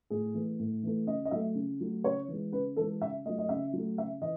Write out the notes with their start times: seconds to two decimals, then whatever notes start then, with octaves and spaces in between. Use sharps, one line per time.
0.10 A2 G#4
0.34 E3 A3
0.59 A2
0.83 E3 A3
1.07 C#3 D#5
1.25 D#5
1.31 F#3 A3 E5
1.55 C#3
1.81 F#3 A3
2.04 C#3 C#5
2.28 E3 G#3
2.52 C#3 B4
2.76 E3 G#3 A4
3.01 C#3 E5
3.25 A3 D#5
3.29 F#3
3.38 D#5
3.49 C#3 E5
3.73 F#3 A3
3.98 C#3 E5
4.22 E3 D#5